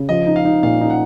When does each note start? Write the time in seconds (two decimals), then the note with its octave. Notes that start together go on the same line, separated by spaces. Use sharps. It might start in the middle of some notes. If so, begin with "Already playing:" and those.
Already playing: C#3
0.09 F3 D#5
0.27 D#4
0.36 F5
0.45 D#4
0.63 A#2 F5
0.81 D#4
0.90 F#5